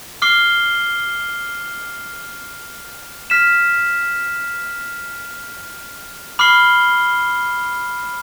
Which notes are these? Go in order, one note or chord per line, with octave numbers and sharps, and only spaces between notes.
D6 F6 C7 G7
F6 B6 E7
B5 D6 F6 C7 G7